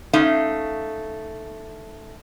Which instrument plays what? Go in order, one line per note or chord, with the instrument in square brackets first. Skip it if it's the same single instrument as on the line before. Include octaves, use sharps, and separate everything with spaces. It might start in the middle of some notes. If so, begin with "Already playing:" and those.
[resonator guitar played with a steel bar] A3 C#4 D#4 F5